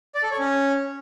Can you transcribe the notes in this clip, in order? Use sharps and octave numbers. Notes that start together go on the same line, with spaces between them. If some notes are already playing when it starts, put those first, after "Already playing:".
D5
A4
C#5
C#4